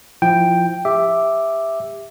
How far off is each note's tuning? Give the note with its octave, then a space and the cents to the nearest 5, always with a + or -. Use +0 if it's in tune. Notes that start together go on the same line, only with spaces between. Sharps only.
F3 +0 E4 +0 G5 +0
G4 +30 E5 +0 D6 +0